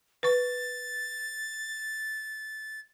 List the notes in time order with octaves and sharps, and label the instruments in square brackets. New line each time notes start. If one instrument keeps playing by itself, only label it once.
[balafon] B4 C#6 [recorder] A6